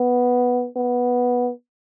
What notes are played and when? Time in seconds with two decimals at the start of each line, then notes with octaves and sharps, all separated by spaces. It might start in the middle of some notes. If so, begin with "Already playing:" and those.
Already playing: B3
0.76 B3